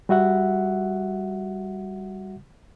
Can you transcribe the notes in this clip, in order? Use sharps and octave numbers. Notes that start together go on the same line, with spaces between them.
G3 F#4 E5 F#5